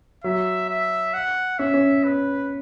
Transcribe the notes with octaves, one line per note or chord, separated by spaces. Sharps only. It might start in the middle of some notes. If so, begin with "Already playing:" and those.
F#3 E5
E5
F#5
C#4 E5
C#4
B4